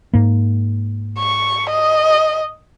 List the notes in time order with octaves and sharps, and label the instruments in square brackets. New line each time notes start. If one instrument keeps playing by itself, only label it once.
[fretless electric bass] G#2 A#3
[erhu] C#6
D#5